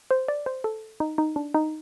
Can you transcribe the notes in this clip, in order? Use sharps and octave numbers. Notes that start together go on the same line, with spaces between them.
C5
D5
C5
A4
D#4
D#4
D4
D#4